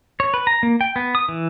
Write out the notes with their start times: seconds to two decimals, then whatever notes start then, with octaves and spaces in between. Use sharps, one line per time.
0.20 C#5
0.34 B4
0.47 A#5
0.63 A#3
0.81 G5
0.96 B3
1.15 D#6
1.29 E3